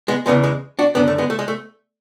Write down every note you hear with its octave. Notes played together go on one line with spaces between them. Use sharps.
G#3 B3
E2 C#3 E3 G#3 B3
G#3
D4 F#4
F#2 D3 B3 D4
A3
G#3 B3
A3
G#3
A3